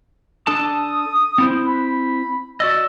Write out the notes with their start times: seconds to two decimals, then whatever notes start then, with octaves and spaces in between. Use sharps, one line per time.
0.47 D4 A4 A5 D#6
1.38 C4 E4 C5
1.66 B5
2.60 F#4 D5 D#5 E6